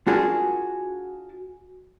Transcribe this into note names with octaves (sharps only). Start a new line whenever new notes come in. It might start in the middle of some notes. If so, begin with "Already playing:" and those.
D4 F4 F#4 G#4 A#4 A5